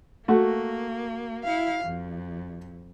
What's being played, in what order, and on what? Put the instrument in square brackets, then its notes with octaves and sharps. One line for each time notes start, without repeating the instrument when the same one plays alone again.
[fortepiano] A3 F#4 [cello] A#3
[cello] E4 F5
F2